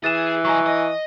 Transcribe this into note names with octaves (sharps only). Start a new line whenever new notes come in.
E3 G#4 A6 E7
F#3 D#5 G#5 A#5 C#6
D#5